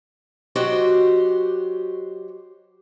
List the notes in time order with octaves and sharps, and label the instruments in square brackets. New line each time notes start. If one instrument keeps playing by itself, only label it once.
[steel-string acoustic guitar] F#3 F#4 G4 C5 D#5